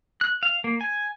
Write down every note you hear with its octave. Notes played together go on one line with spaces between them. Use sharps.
F#6
F5
A#3
G#5